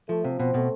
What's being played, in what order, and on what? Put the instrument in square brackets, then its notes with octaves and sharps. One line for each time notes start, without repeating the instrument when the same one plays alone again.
[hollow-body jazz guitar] F3 [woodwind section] A3
[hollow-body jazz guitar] C3 [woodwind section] F3
[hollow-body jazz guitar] B2 [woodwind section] C4
[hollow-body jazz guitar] B2 [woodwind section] A3